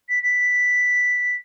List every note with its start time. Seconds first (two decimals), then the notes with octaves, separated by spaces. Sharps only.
0.08 B6
0.22 B6